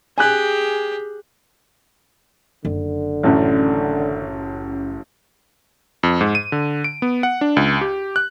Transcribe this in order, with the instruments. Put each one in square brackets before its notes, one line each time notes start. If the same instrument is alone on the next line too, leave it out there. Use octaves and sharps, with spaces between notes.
[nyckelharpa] G4 G#4 [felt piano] G#5 F#6
[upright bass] F#1 [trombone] D3
[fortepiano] A1 F#2
[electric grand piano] F2
G#2
D#7
D3
D7
B3
F#5
D4
C#2
G4
F#6